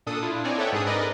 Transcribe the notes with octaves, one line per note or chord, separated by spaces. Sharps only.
A#2 D4 A4 D#6
D4 E4 F4
C4 D#4 C#5 D5 G#5
A4 B4 C#5 E5 F#5 G5
G#2 D4 G#4 A4 D#6
G#2 A#4 B4 D5 D#5